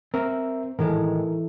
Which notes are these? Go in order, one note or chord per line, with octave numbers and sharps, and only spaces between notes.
C4 A#4 E5
A2 D#3 E3 G#3 A4 A#4